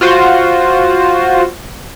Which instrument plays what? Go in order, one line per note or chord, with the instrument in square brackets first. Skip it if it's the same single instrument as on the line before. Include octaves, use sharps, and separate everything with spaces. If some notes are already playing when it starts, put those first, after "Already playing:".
[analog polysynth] F4 F#4 C5